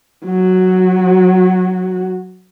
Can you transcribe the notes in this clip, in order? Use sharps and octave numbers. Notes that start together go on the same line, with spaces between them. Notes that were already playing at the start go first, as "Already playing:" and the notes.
F#3 F#4